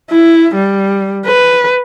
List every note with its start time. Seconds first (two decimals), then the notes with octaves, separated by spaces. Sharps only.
0.11 E4
0.55 G3
1.26 B4